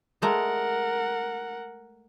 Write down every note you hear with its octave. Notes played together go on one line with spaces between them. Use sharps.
G#3 A3 A#4 F#5 A#5